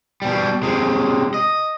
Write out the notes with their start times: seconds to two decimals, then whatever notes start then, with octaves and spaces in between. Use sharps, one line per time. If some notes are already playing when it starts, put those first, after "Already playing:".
0.22 B2 G3
0.63 C3 G#3
1.34 D#5